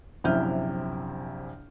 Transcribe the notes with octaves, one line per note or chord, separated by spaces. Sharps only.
A#1 F#2 C3 E4 F6 G6